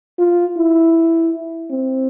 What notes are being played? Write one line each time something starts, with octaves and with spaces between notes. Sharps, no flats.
F4
E4
C4